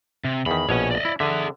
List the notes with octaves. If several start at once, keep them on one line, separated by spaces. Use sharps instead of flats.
C3
E2 D#3 B5
A#1 B2 C#5 G#5
D5 D#5
E4
D3 G#4 E5